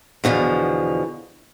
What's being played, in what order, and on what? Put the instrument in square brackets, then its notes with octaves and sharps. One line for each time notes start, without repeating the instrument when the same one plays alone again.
[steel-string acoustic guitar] E2 B2 D3 F3